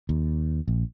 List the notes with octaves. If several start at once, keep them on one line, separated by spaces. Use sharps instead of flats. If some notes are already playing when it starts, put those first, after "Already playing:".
D#2
A#1